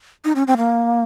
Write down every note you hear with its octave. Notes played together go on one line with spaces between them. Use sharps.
D#4
C#4
C4
A#3